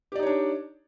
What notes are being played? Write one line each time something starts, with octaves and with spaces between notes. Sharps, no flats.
D4 D#4 G4 C#5 D5